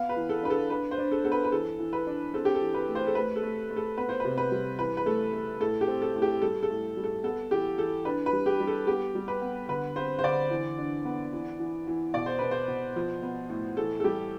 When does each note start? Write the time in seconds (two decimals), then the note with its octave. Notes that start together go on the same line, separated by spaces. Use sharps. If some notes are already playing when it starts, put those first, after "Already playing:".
Already playing: B3 F5
0.09 B4
0.16 E3
0.29 A4
0.43 D4 B4
0.50 A4
0.70 D4 B4
0.91 C5
0.98 D4
1.12 A4
1.24 B3 A4
1.32 B4
1.44 B4
1.52 E3 A4
1.79 E3
1.93 B4
2.07 D4
2.34 C4 A4
2.45 G4
2.55 A4
2.61 E3
2.74 B4
2.88 A3
2.95 C5
3.07 A4
3.15 A3 B4
3.36 A4
3.43 A3
3.70 A3
3.76 A4
3.97 B3 B4
4.09 C5
4.20 C3 B4
4.38 B4
4.51 G3
4.79 E3 B4
4.97 B4
5.06 A3 A4
5.33 A3
5.60 A2 A4
5.81 G4
5.88 C4
6.02 A4
6.16 A2
6.22 G4
6.42 G3 A4
6.63 A4
6.70 A2
6.97 G3
7.04 A4
7.24 B3 A4
7.51 E3 G4
7.78 E3 A4
8.05 D4 B4
8.26 B4
8.33 G3
8.46 G4
8.60 G3
8.67 A4
8.87 B3 G4
9.15 G3
9.28 B4
9.42 B3
9.68 D3 B4
9.96 C4 C5
10.19 C5
10.24 D3 D5
10.50 E3
10.78 D4
11.05 B3
11.33 E3
11.59 E3
11.87 E3
12.14 B2 D5
12.26 C5
12.39 B2 B4
12.51 C5
12.68 B2
12.96 F3
13.22 B3
13.49 A2
13.77 E3 A4
14.00 A4
14.04 G3 G4